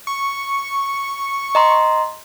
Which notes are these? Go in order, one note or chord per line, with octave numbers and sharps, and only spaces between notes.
C#6
D#5 A#5 C6